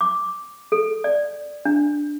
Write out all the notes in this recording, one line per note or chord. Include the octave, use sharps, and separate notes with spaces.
D6
A4
D5
D4